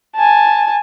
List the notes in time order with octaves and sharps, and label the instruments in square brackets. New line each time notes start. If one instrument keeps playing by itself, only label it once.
[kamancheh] G#5 A5